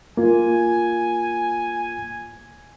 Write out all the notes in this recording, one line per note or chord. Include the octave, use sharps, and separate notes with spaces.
A#3 F4 G#5